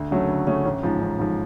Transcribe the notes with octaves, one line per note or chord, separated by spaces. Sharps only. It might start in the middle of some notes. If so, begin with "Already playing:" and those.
Already playing: D2
C#3 F#3 A3 C#4
D2
C#3 F#3 A3 C#4
A1
G#2 F3
A1
G#2 F3